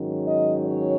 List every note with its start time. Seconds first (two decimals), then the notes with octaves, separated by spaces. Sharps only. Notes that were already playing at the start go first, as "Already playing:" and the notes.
Already playing: G#2 D#3 F#3 C#4
0.26 D#5
0.65 C#5